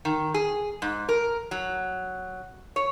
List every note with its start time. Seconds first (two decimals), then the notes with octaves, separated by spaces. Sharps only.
0.05 D#3
0.34 G#4
0.82 G#2
1.09 A#4
1.51 F#3
2.76 C#5